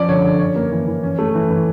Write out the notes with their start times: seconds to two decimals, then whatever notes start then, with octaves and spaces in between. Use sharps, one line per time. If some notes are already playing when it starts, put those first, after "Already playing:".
Already playing: F3 C#4 D5
0.09 D3 C#5
0.24 D3
0.39 C#4 C#5
0.56 A#3
0.72 E3
0.87 E3
1.03 C#4
1.19 A3
1.35 E3
1.50 E3